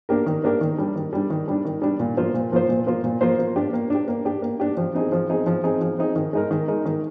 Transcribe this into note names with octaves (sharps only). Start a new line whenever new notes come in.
A#3 D4 G4 A#4
D#3
A#3 D4 G4 A#4
D#3
G3 D4
D#3
G3 D4
D#3
G3 D4
D#3
G3 D4
A#2
F3 A#3 F4 C5
A#2
F3 A#3 F4 C5
A#2
F3 A#3 F4 C5
A#2
F3 A#3 F4 C5
A#3
D4 G4
A#3
D4 G4
A#3
D4 G4
A#3
D4 G4
F3
C4 D#4 G#4
F3
C4 D#4 G#4
F3
C4 D#4 G#4
F3
C4 D#4 G#4
D#3
G#3 D#4 A#4
D#3
G#3 D#4 A#4
D#3